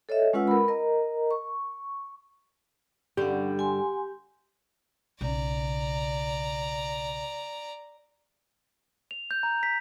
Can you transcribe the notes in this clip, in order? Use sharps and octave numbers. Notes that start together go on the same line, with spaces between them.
A4 C#5 D#5 E5
G#3 C#4 F4 B4 F#5 E6
A#4 B5
A#4 D#5 A#5
C#6
G2 D3 G3 C#4 G4 F#5
F#5 G#5 C6
B1 C#3 D5 A#5
F7
G6
A#5
B6